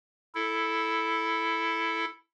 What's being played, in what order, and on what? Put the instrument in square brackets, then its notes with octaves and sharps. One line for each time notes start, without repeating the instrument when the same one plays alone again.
[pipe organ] E4 A4